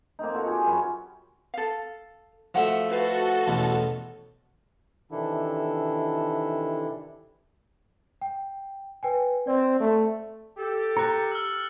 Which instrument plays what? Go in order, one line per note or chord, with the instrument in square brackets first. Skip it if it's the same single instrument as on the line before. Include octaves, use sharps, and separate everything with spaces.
[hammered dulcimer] A#3 C4 D#4
D#4 F4 F#4 A4
G4 G#4
F#2 C#4 B4
[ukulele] A4 F5
[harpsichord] F3 A3 E5 [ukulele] F#4 F#5
[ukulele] E4 B4 F5 [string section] F#4 A4
[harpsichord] A1 E2 B2
[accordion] C3 D#3 E3 D4 E4 A4
[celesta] G5
B4 G5 G#5
[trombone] C4 [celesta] D5
[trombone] A3
[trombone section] G4 [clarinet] A4
[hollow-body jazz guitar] A#5 [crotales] F#6 A6 C#7
[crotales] E6 F6